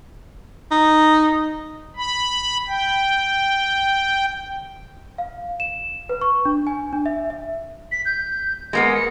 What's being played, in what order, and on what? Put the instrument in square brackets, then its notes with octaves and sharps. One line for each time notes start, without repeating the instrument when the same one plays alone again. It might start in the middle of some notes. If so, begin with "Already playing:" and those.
[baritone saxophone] D#4
[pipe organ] B5
G5
[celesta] F5
E7
B4
C#6
D4
G#5
D4
E5
E5
[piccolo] B6
G6
[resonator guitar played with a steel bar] G#3 A#3 B3 [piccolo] A#6
[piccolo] C#7